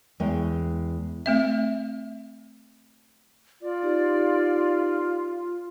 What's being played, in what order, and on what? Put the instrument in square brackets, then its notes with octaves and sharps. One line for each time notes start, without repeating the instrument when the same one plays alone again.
[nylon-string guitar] E2 G#3 C#5 D#5 G5
[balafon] A3 C4 E5
[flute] F4 [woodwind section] D5
[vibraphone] D#4 G4